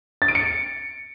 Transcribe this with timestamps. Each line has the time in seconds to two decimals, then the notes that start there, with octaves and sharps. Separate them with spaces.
0.22 A6
0.28 D7
0.35 C#7